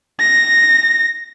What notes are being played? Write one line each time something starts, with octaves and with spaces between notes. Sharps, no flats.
A#6